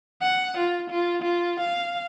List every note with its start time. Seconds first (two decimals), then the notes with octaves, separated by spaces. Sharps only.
0.22 F#5
0.57 F4
0.89 F4
1.22 F4
1.60 F5